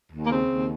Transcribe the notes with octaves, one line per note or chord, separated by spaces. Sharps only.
D#2
A#3
C#3 C4
D#2